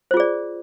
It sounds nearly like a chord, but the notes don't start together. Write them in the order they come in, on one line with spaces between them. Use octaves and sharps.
C5 F4 G#4 D5